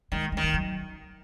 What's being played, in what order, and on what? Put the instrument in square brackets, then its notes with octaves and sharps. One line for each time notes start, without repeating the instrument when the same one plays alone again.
[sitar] D#3 [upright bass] G#3
[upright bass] G#3
[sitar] D#3
[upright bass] G#3
F#3